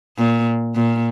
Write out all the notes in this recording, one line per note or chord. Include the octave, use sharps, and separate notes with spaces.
A#2
A#2